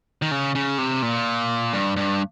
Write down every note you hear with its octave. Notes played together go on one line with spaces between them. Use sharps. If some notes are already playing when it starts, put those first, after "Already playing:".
D#3
C#3
C#3
C3
A#2
G2
G2